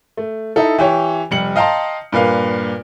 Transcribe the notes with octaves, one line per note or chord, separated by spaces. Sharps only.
A3
D#4 E4 A4
E3 G4 C#5
F1 G3 C#7 F#7
D#5 F5 G5 A5 A#5 C6
G2 A#2 B4 F5